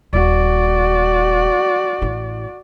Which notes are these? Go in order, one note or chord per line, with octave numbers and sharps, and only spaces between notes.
D#1 F#4 D5
A1 E4